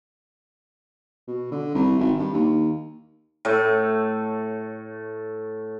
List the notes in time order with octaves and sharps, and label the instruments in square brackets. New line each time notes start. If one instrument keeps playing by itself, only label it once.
[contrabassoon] B2
D3
C2
G#1
G2
D#2
[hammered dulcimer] A2 A3